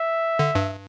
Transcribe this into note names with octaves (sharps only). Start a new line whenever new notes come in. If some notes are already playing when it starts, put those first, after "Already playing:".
Already playing: E5
D3
G2